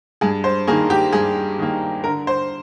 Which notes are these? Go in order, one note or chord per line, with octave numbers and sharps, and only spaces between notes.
G2 G#4
C5
D#3 A#3 G#4
G4
G2 G#4
D#3 A#3
D3 A#4
C5